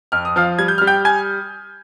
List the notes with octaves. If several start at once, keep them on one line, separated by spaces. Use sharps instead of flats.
F2 F6
D#6
F3 F5 F6
G3 G#6
G6
G3 F6
G5 G6
G#5 G#6